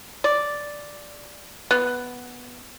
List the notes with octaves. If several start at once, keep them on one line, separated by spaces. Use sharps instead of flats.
D5
B3